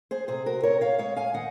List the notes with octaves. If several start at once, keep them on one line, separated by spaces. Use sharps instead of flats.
G#4 C5
C3 G#4 C5
F#4 A#4
C4 A#4 C#5
C#5 F5
G#3 C#5 F5
F5 G#5
D#3 D#5 F#5